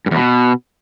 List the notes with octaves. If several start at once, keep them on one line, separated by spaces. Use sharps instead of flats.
G2
E2
B2